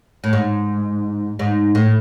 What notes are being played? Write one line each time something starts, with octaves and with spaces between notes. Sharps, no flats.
A2
G#2
G#2
A2